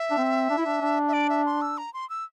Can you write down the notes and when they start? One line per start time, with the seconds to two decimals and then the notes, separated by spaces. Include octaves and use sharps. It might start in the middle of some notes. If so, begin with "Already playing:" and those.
Already playing: E5
0.11 D4
0.17 C4
0.50 D4
0.58 E4
0.66 D4
0.81 D4
1.08 E5
1.13 D5
1.30 E5
1.46 C6
1.61 E6
1.78 A#5
1.94 C6
2.10 E6